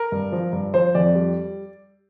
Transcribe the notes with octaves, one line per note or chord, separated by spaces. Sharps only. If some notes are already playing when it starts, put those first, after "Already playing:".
Already playing: A#4
G2
F3
G2
F3 C5
F2 D5
G3